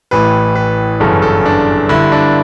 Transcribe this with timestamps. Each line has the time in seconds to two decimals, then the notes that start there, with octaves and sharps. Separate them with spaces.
0.11 A1 A2 E3 B4
0.55 B4
1.00 G1 F#2 C#3 E3 A4
1.22 A4
1.46 D4
1.89 G1 G2 D3 E4
2.12 D4